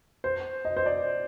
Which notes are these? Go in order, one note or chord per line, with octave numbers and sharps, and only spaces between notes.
C5
D#5
C5
D5